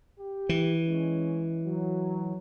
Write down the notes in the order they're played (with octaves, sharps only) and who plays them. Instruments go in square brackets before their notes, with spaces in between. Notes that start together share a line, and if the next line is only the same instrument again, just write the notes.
[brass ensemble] G4
[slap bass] E3
[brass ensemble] G#3 C#4
F#3